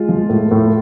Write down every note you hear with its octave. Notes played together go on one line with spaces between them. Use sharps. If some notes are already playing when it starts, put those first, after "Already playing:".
Already playing: G#3 F4
F3
A2
A2